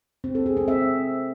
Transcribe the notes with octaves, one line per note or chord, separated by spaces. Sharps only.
C4
A4
G#4
C4
E5